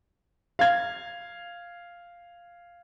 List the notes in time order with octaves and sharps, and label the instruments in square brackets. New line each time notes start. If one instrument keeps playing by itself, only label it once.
[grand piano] F5 G#6